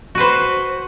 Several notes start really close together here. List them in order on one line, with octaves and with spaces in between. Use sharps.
F#4 B4 C5